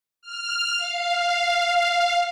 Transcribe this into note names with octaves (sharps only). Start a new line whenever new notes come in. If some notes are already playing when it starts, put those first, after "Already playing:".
F6
F5